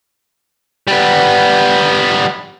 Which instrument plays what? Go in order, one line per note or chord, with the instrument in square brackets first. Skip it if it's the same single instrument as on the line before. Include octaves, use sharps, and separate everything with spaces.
[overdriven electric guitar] G3 B3